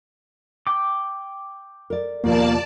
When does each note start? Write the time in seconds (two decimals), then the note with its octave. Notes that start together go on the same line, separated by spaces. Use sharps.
0.67 G5 D6
1.90 A#4 D5
2.24 D#2 B2 F3 A#3 D5 A5